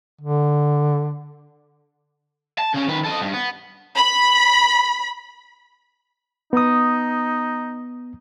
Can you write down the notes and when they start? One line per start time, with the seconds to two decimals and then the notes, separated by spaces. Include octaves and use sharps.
0.21 D3
2.59 A5
2.74 C#3 C#4
2.88 D#3 B4
3.04 A4 D#5
3.21 G2
3.33 B3
3.97 B5
6.53 B3 D#4 D#6